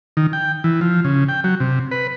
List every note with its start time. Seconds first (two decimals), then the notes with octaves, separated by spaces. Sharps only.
0.17 D#3
0.33 G5
0.64 E3
0.81 F3
1.05 C#3
1.29 G5
1.44 F#3
1.60 C3
1.91 B4